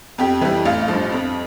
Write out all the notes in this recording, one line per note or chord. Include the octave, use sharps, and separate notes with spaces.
F2 G4
E3 G3
A1 F5
F5
G2 F3
F2